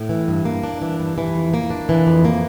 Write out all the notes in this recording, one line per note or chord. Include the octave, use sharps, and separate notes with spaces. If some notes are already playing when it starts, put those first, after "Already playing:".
Already playing: A2
E3
G2
A#3
D4
E3
G2
E3
F2
A#3
D4
E3
F2
A#3